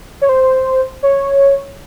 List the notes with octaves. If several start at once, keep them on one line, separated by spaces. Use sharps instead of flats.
C#5
C5
C#5